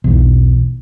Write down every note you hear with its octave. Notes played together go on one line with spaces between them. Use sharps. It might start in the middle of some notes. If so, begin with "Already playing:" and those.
B1 E2